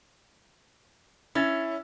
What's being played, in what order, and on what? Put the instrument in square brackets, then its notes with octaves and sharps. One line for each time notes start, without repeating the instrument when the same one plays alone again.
[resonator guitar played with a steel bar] C#4 [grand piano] E4 E6 A6